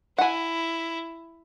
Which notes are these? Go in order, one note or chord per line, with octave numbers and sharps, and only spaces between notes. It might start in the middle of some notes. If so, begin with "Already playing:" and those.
E4 F#5 G#5